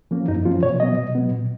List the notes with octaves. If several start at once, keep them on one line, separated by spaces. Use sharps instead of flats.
F3 A#3 C#4
F#2 D#4
F3 A#3 C#4 F4
B2 C#5
F#3 B3 D#5
B2
F#3 B3
A#2